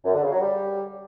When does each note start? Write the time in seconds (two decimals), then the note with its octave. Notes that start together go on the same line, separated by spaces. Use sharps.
0.05 F#2
0.14 D3
0.23 C#3
0.32 F#3
0.41 G3